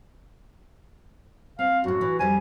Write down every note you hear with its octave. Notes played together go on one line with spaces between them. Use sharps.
C4 F5
F#2 A2 F#4
E3
F2 F3 G3 G#5